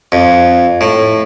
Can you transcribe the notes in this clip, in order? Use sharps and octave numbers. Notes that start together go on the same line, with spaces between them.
F2
A2